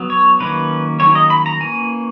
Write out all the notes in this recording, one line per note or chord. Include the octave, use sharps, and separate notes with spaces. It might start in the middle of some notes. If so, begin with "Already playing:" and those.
Already playing: F#3 B3
C#5
D#3 F#3 A#3 C#4 B4
D#3 F#3 A#3 C#4 C#5
D#5
B5
A#5
E3 A#3 C#4 G#5